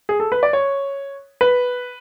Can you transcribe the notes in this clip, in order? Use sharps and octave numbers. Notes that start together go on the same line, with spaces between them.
G#4
A4
B4
D5
C#5
B4